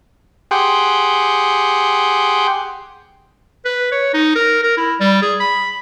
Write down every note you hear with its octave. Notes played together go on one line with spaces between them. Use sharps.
G4 G#4 F#5 G5 C6
B4
C#5
D#4
A#4
A#4
E4
G3
G#4
B5